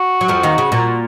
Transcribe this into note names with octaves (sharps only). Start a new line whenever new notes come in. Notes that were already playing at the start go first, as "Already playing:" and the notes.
Already playing: F#4
F#3
F2 F3
D#2 D#3
C#3
A#2